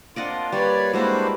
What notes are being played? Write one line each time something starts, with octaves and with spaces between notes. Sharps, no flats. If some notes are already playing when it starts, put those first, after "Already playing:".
A#3 C4 D4 F4 D5 D#5 F#5
G3 A#3 B4 C#5 D5
G3 G#3 A#3 D4 E4 F#4 B4 C5